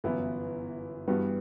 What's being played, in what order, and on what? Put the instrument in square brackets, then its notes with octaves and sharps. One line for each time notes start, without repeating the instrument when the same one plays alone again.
[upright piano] G1 F#2 E3 B3 E4
G2 E3 G3 B3 F#4